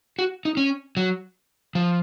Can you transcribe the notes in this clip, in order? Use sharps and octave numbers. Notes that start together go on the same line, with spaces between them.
F#4
D#4
C#4
F#3
F3